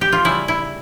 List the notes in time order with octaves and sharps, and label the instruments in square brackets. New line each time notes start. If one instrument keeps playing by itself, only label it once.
[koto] G4
F4
C#3 G3 E4
E4